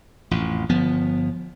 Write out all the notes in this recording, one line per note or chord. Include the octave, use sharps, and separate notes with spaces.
A1 F2
G1 F3 B3